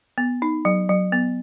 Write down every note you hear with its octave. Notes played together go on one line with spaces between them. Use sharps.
B3
D#4
F#3
F#3
B3